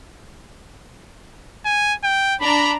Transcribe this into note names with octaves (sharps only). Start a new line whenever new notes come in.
G#5
G5
D4 A#5 B5